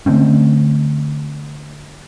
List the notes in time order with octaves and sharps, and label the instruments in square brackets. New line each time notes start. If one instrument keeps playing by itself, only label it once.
[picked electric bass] D3 A3 C4 C#4